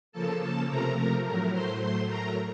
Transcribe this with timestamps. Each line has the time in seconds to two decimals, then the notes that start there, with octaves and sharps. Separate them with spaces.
0.12 C#3 F3 A#3 A4 A5
0.41 A4 A5
0.68 C3 F3 A3 A#4 A#5
0.96 A#4 A#5
1.24 A2 F#3 A3 A#4 A#5
1.52 C5 C6
1.80 A2 F#3 A3 C5 C6
2.08 A#4 A#5